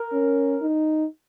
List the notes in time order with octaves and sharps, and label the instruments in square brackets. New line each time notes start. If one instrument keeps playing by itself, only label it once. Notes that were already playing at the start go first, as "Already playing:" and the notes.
Already playing: [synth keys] A#4
[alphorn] C#4
D#4